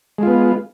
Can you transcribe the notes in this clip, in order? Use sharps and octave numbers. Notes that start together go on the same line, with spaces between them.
G#3 B3 F4